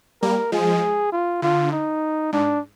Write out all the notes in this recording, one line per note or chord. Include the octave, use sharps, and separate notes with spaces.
G3 A#3 A#4
F3 G#3 G#4
F4
D3 F4
D#4
G#2 D4